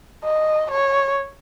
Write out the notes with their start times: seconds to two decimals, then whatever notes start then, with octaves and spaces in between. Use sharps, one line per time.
0.24 D#5
0.70 C#5